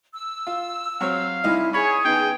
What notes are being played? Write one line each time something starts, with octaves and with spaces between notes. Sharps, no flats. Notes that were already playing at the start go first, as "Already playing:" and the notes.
E6
F4
F#3 C4 C#5 F5
C2 D#4 E4 D#5
G#4 C#5 B5
C#3 B3 D#4 G5